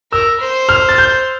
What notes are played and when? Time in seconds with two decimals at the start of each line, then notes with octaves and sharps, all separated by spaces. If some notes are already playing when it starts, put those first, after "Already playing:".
0.12 A#4 E6
0.40 C5
0.69 F6
0.89 A6
0.98 G6